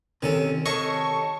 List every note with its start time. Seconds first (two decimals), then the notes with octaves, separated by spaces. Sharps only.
0.22 C3 D#3 C#4 A4
0.66 D#3 A4 C#5 D#5 C#6